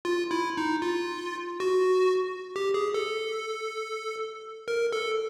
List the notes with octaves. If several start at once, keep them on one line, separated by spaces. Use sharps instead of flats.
F4
E4
D#4
F4
F#4
G4
G#4
A4
A#4
A4